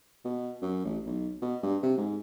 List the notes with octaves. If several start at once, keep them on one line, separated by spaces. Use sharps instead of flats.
B2
F#2
A1
B1
B2
G2
C3
G#2